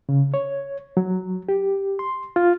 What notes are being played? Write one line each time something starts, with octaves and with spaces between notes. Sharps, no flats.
C#3
C#5
F#3
G4
C6
F4